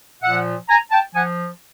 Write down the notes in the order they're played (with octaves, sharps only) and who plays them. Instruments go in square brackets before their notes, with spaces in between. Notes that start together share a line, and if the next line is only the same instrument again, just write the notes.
[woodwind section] A#2 F3 E5 F#5
G#5 A#5
G5 A5
F3 F#5 G#5